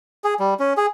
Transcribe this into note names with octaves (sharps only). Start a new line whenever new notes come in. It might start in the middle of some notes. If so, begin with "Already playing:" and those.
G#4
G3
C#4
G#4